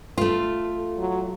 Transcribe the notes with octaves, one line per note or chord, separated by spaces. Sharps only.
A3 F4 A4
F#3